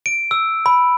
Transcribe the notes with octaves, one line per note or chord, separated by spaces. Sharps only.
D7
E6
B5